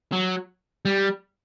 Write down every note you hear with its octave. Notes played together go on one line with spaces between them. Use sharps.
F#3
G3